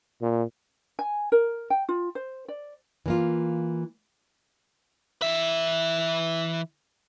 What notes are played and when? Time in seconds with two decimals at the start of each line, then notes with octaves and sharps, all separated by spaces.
0.22 A#2
0.99 G#5
1.32 A#4
1.70 G5
1.89 F4
2.15 C5
2.48 D5
3.06 E3 A#3 F4
5.22 E3 E5